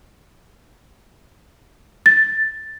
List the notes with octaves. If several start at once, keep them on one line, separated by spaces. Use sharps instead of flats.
A6